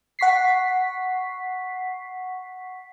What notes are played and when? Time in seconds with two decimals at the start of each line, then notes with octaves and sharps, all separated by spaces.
0.19 F#5 C#6 B6 C7